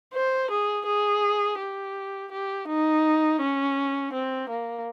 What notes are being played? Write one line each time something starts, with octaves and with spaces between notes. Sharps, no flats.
C5
G#4
G#4
G4
G4
D#4
C#4
C4
A#3